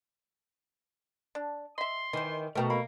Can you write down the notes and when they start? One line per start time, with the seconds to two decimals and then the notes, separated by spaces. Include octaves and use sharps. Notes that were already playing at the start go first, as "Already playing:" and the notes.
1.35 D4
1.78 D#5 E5 C6
2.13 D#3 E3 C5
2.55 B2 A3 A#4 G5 A#5
2.70 A#3 B5